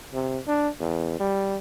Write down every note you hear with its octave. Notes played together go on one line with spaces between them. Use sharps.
C3
D4
E2
G3